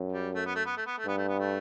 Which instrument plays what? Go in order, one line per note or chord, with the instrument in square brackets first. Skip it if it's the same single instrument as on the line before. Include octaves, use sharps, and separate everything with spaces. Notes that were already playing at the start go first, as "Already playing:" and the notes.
Already playing: [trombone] F#2
[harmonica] G3
A3
B3
A3
B3
A3
B3
A3
[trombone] G2 [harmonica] B3
[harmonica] A3
B3
A3